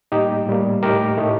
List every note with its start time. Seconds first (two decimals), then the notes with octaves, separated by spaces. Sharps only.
0.12 A2 G3 A#3 D#4 G4
0.47 A2 G3 A#3
0.83 A2 A3 D#4 G4 A#4
1.18 A2 A3 D#4